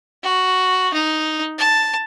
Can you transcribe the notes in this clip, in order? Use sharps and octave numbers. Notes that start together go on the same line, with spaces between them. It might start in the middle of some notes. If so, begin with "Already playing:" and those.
F#4
D#4
A5